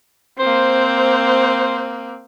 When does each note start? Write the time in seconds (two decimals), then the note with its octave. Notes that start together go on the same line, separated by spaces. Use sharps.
0.39 A#3 C4 C5